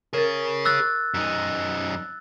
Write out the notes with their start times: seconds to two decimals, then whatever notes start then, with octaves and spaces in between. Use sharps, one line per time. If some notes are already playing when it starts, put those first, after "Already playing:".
0.13 G#4 A#4 C#5 A6
0.65 C#6 E6 F#6 A6
1.14 F#2 D#4